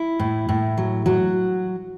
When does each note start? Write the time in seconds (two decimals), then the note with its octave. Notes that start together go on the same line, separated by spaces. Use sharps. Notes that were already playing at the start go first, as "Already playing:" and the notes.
Already playing: E4
0.19 A2
0.49 A2
0.77 F#3
1.06 F#3 F#4